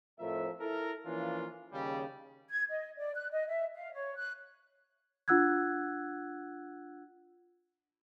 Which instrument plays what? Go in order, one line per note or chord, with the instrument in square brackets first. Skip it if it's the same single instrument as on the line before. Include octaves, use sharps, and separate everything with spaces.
[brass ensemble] F2 A2 F3 A#4 E5
E4 A4 A#4
E3 F3 A#3 C#4 D4 F4
D#2 C#3 G3
[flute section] G#6
D#5
D5
F#6
D#5
E5
F5
C#5
F#6
[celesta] D4 F4 F#5 E6 F#6 G#6